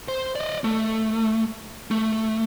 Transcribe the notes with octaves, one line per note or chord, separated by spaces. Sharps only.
C5
D5 D#5
A3
A3